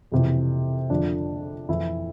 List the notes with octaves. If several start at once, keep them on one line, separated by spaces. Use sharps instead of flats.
F2 C3 E3
F2 D3 F3 D4
F2 E3 E4